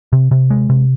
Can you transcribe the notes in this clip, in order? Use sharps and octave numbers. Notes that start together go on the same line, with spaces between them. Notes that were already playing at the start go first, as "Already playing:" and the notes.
C3
C3
G#3
C3